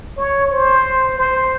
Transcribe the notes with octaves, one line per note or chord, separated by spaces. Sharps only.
C#5
C5
C5